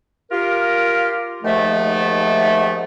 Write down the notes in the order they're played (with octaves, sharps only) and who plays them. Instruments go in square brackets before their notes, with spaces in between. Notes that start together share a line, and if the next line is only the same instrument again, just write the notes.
[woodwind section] F4 G4 A#4
D#2 G#2 F3 A3